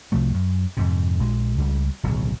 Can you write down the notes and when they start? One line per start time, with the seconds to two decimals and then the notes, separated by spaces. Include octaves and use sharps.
0.12 C2 C3 F3 A3
0.34 F#2
0.77 F2 G#2 C3
1.19 A#1 G#3
1.58 C#2 G3
2.03 D1 B1 C#3